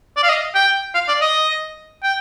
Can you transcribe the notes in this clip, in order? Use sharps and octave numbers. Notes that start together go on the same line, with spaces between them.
D5
F5
D#5
G5
F5
D5
D#5
G5